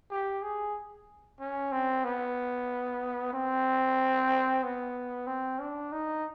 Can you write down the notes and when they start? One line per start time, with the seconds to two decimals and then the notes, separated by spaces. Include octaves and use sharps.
0.10 G4
0.43 G#4
1.40 C#4
1.72 C4
2.04 B3
3.33 C4
4.63 B3
5.27 C4
5.59 D4
5.92 D#4